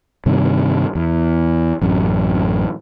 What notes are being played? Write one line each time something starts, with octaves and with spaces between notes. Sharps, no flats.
G2 C3 D#3
E2
A1 F#2 A2